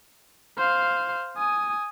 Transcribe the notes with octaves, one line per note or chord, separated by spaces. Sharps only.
C5 F5
G#5 D#6